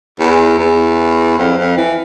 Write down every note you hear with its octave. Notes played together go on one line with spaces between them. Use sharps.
E2
E2
F2
F2
E3